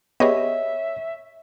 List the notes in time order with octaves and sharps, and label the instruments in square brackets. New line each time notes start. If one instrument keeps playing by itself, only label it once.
[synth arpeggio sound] B3 G4 G#4 [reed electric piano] C#5 [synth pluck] D#5 [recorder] E5